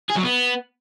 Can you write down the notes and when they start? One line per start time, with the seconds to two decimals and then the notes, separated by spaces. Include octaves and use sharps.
0.10 G#4
0.16 F#3
0.23 B3